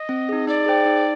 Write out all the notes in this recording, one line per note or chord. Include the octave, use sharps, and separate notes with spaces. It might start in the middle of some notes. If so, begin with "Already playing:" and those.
Already playing: D#5
C4
D#4 G#4
D#4 D5
G#4 C5 G5
D#4